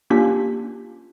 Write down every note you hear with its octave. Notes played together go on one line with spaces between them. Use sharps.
A#3 C#4 D4 F4 G4 B6